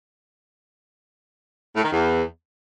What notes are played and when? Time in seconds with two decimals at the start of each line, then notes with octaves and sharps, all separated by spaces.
1.75 A2
1.83 D#3
1.91 E2